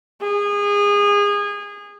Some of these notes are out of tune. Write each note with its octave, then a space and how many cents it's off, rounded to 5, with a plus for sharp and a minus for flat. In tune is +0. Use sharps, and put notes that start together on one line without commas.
G#4 -25